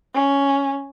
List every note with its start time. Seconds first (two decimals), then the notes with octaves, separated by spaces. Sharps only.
0.14 C#4